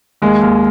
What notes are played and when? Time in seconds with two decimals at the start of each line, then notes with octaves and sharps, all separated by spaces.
0.22 D#2 G#3
0.41 D#2